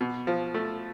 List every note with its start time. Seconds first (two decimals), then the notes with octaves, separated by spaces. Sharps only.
0.01 B2
0.27 F3
0.54 A3